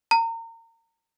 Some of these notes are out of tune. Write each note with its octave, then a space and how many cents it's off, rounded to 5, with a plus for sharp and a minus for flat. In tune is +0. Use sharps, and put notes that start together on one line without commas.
A#5 -30